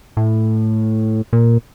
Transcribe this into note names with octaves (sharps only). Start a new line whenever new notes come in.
A2
A#2